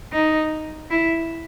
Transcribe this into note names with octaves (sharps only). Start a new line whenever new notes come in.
D#4
E4